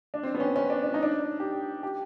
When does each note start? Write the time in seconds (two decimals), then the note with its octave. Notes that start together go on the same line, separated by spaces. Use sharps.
0.14 D4
0.23 C4
0.34 B3
0.40 C#4
0.45 C4
0.56 C#4
0.70 D4
0.84 D4
0.94 D#4
1.03 D4
1.40 G4
1.83 G4